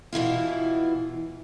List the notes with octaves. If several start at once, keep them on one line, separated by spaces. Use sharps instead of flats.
B2 E3 E4 F4